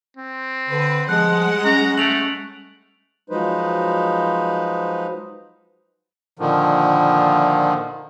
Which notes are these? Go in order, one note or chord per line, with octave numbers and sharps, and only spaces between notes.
C4
D3 B4
F3 G3 G#3 F#5 F#6
C#4 A#5
A3 D7 F7 F#7
F3 F#3 G#3 D#4 B4 C5
A#2 D3 D#3 F3